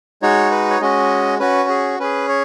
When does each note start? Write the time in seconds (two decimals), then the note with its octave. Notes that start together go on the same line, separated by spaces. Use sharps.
0.22 G#3 D#4 F#4 C#5
0.51 B4
0.70 C#5
0.81 G#3 C#4 F#4 D#5
1.39 C#4 F#4 B4
1.69 G#4
1.99 C#4 G#4 B4
2.28 C#5